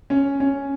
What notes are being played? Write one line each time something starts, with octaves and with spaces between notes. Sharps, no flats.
C#4
C#4